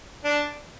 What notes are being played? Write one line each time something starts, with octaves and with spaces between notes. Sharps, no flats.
D4